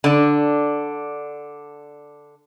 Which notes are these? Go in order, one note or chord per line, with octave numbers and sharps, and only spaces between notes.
D3 D4